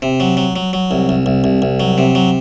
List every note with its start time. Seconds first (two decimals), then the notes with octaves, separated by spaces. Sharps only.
0.02 C3
0.20 F#3
0.37 F#3
0.56 F#3
0.73 F#3
0.91 C2
1.09 C2
1.26 C2
1.44 C2
1.62 C2
1.80 F#3
1.98 C3
2.15 F#3